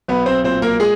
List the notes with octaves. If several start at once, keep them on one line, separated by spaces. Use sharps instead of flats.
B1 B3 B4
C4 C5
A#2 C4 C5
A#3 A#4
G#3 G#4